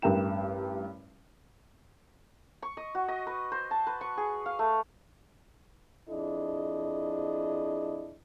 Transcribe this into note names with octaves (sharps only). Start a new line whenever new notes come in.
A1 G2 A#4 G5 E7
C#6
D#5
F#4
D#5
B4
C5
A5
B4
C#6
G#4
F5
A3
F2 D4 E4 G#4 D#5